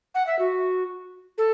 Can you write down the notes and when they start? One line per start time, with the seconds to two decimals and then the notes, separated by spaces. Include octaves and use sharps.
0.15 F#5
0.27 E5
0.39 F#4
1.38 A4